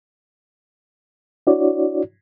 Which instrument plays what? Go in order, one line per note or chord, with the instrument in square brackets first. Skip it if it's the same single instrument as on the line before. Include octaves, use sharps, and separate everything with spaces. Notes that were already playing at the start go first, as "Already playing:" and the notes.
[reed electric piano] D4 E4 F#4 C#5 D5